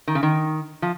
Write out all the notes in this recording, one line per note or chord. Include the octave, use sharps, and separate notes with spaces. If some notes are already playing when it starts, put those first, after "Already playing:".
D#3
C#3
D#3
F3